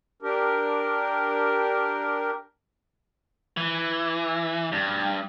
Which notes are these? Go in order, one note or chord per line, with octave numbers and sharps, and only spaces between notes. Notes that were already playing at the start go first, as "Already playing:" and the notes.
D4 G4 A#4
E3
G2